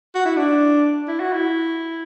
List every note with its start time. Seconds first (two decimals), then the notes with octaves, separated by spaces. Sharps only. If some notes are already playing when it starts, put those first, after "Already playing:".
0.15 F#4
0.25 E4
0.37 D4
1.08 E4
1.20 F#4
1.33 E4